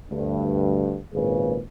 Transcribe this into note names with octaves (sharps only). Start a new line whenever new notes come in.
D2 G2
G#1 A#2 C#3 G#4 B4